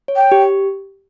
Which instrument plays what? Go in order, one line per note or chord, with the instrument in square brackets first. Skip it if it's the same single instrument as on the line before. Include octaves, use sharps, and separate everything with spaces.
[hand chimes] C#5
[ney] G5
[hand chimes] G4